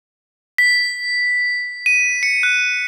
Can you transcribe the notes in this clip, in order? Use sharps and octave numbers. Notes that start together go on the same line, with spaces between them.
B6
D#7
C#7
F#6